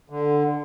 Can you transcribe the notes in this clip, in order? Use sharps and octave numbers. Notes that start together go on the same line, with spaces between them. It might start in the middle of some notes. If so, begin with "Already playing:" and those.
D3